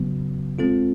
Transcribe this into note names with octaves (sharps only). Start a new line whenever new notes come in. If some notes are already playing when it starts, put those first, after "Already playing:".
Already playing: C#3 F#3 B3
G#3 C4 F4 A4